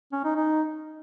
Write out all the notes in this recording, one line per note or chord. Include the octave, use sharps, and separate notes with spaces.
C#4
D#4
D#4